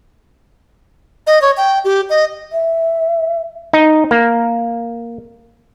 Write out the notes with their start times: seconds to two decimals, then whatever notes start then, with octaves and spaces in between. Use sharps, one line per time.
1.27 D#5
1.42 C#5
1.57 G5
1.85 G4
2.10 D#5
2.52 E5
3.73 D#4
4.11 A#3